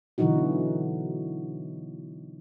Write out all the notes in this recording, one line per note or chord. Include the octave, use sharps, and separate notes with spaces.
B2 D3 E3 F#3 D#4 F#4